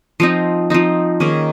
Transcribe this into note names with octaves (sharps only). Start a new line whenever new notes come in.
F3 C4 D#4
F3 C4 D#4
D#3 A#3 C#4 G#4